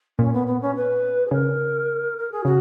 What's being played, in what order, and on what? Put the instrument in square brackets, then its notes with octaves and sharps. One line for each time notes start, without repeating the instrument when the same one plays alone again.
[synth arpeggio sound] A#2 [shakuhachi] C#4
[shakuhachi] B3
B3
C#4
B4
G#4
[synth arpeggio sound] C#3 [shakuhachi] A#4
[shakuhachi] A#4
G#4
[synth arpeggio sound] C#3 [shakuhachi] F#4